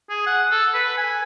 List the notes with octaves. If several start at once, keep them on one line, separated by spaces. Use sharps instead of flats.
G#4
F#5
A4
B4
G#5